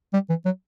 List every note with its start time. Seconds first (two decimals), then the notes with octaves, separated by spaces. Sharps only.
0.13 G3
0.29 E3
0.45 F#3